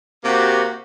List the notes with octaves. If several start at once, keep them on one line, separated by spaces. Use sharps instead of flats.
C3 A#3 F#4 G4